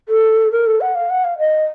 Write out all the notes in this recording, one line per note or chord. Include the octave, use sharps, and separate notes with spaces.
A4
A#4
A4
F#5
F5
F#5
F5
D#5